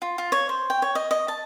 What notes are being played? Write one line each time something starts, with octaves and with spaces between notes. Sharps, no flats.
F4
F4
C#5
C5
G5
C#5
D#5
D#5
A5